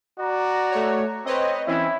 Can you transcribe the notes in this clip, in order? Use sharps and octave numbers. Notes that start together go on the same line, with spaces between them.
F#4 D5 A#5
A3 C#5
C4 B4 C#5 D#5
E3 C4 C#4 E4